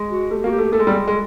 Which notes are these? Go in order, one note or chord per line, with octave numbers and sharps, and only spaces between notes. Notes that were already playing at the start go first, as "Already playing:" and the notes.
Already playing: G#3
F#4
A3 G4
A#3 F#4
G4
A3
A3 A4
G#3
G3
G#3
G#3